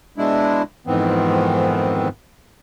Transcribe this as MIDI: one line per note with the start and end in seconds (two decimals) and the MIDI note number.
0.18 0.62 47
0.18 0.62 56
0.18 0.62 62
0.18 0.62 64
0.87 2.08 41
0.87 2.08 44
0.87 2.08 51
0.87 2.08 52
0.87 2.08 59
0.87 2.08 60